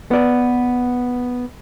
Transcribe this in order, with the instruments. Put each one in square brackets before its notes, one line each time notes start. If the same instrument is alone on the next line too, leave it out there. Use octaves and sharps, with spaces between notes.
[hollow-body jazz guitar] B3 D5